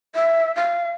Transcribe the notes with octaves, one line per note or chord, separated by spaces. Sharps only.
E5
F5